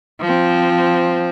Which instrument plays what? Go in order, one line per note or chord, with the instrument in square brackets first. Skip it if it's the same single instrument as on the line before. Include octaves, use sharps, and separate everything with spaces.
[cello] F3 C4